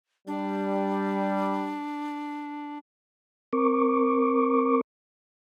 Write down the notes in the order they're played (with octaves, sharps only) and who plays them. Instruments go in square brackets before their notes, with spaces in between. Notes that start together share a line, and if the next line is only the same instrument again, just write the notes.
[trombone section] G3 [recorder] D4
[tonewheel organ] C4 A#4 C#6 D6